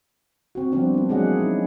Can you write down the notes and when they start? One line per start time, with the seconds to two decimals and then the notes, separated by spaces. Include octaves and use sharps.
0.55 C4 F#4
0.72 F3 G3 B3 C4 D4
0.94 A#3 D4
1.09 F#3 G#3 A#3 G#4 D#5 F#5
1.26 E4
1.39 D#4